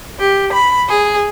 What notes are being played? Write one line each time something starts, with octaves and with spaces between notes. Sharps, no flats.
G4
B5
G#4